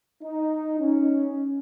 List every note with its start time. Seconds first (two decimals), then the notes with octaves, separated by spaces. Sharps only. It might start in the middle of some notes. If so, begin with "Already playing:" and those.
0.23 D#4
0.79 C#4